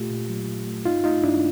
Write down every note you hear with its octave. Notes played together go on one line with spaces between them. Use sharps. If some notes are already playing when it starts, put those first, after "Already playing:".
Already playing: A#2 A3 F4 G4
A#2
F#3
A#2
A3
G2 D#4 F4
A3 D#4 F4
G2 D4 E4